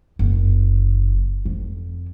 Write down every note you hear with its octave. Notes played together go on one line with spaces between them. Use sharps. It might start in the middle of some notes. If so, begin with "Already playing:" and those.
F#1
F2